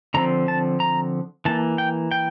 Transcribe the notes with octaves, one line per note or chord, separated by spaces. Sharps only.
D3 F3 C4 A#5
A5
A#5
E3 A#3 A5
G5
G5